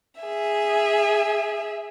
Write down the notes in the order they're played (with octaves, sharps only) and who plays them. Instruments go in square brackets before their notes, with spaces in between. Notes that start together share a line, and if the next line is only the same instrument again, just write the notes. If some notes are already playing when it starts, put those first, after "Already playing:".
[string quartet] G#4 E5